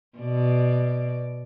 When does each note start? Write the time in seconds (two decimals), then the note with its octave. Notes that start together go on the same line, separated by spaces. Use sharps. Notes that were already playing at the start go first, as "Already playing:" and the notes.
0.18 B2 D5